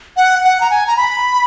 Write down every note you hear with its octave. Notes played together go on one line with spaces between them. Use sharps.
F#5
F#5
A#5
G#5
A#5
B5